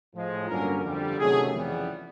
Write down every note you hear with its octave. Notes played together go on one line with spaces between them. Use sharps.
A2 F3 G#3
G2 D3 F#3 A#3 C#4 A#4
F2 D3 G3
C3 D#3 F#3 A3 C#4 G#4
F2 C#3 E3 G3 B3